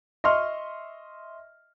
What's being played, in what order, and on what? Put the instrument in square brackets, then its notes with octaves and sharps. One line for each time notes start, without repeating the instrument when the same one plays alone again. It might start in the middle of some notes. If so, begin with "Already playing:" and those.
[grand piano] D#5 E5 C6 C#6 F6